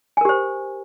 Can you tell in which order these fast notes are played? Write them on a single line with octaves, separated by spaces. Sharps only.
G#5 A#4 G4 C5